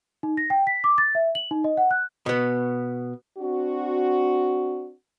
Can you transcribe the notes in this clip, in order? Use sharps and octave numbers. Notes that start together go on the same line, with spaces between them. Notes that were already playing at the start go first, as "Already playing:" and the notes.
D#4
A#6
G5
B6
D6
A6
E5
F#7
D#4
D#5
F#5
F#6
B2 B3
C4 D4 F#4